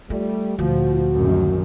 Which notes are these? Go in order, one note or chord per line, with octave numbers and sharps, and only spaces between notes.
G3 A3 F4
D2 A#2 F3 F4 F#4
A#1 F#2 D#3